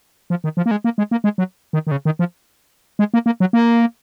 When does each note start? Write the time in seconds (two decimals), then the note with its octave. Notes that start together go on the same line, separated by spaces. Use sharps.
0.30 F3
0.44 D#3
0.57 F3
0.66 A#3
0.71 G#3
0.84 A#3
0.98 G#3
1.11 A#3
1.24 G#3
1.38 F#3
1.73 D#3
1.87 D#3
1.91 C#3
2.05 D#3
2.19 F3
2.99 G#3
3.14 A#3
3.26 A#3
3.40 F#3
3.53 A#3